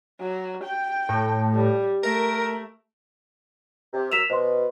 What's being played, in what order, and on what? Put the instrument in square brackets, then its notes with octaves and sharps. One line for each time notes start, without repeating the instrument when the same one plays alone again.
[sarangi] F#3
G5
[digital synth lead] A2
[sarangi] G3
[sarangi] A3 [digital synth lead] A#4
[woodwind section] C3
[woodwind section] F#3 A#4 E6 [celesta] B6 E7 F7
[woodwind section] B2 [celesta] C5 C6